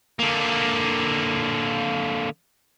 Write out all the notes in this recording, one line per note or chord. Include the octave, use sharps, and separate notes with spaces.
D3 A#3